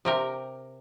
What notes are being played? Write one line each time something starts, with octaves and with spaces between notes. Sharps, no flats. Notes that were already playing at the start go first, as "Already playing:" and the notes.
C3 G4 A#4